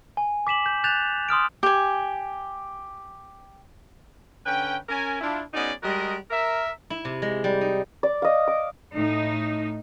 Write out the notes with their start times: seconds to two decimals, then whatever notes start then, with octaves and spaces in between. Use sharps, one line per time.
0.17 G#5
0.47 D6 B6 E7 F#7
0.66 G6
0.84 F#6 G6 A6 E7 F7
1.29 C6 D#6 F6 D7
1.63 G4 G#5
4.45 D3 C#4 B4 G5
4.89 C#4 A#4 G#5
5.21 D4 E4 F4
5.54 B3 C#4 D#4 F#4 G#4 D5
5.83 G3 G#3 F#4 A#4 D#5
6.31 A#4 E5
6.90 E4
7.05 C3
7.22 G#3
7.44 G3
7.61 D#4
8.03 D5
8.22 D#5 F5
8.47 D6
8.95 A2 D#4